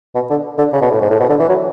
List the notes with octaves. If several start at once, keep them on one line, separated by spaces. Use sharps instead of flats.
B2
D3
D3
C#3
B2
A2
G#2
A2
B2
D3
E3
F#3